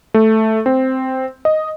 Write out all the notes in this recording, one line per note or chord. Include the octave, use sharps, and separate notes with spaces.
A3
C4
D#5